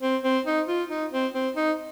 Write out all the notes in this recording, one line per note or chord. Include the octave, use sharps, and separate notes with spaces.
C4
C4
D#4
F4
D#4
C4
C4
D#4